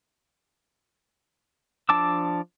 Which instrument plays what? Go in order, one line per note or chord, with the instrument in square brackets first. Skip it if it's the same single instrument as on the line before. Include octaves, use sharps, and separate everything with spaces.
[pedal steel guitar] F3 D4 A5 D6 E6